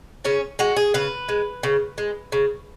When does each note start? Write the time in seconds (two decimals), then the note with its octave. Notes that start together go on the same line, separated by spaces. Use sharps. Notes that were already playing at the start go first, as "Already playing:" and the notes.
0.25 C#3 C#4
0.59 G#3 F#4
0.76 G#4
0.94 C#3 B4
1.29 G#3
1.63 C#3
1.98 G#3
2.32 C#3